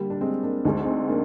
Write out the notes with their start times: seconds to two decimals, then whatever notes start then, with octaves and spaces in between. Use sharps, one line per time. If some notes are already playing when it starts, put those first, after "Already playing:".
Already playing: D3 G3 A#3
0.10 D4
0.21 G#3 C4
0.43 A#3 D4
0.65 D2 D3 G#3 D#4
0.85 C4 D#4
1.09 A#3 D4